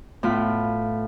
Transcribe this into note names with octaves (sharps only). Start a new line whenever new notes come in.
A2 B3 F4 B5